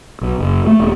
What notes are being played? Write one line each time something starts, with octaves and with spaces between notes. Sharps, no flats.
B1
F#1
A3
D#1